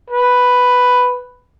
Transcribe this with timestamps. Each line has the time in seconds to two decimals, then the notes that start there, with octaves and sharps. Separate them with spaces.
0.10 B4